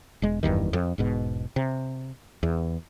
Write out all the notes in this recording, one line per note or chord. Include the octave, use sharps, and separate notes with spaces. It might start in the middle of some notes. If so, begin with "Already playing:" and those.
E1 G#3
F#1 E2 G2 D#3
F2
E1 G#2 B2
C3
E2